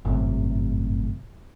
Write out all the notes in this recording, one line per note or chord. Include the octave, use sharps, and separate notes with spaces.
G1 F#2 A2 C3